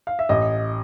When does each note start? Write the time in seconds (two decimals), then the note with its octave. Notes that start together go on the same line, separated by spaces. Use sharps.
0.07 F5
0.19 E5
0.29 A1 D#5